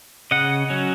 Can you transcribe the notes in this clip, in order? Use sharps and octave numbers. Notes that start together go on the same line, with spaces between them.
C#3 D#5 F#5
F#3 C#4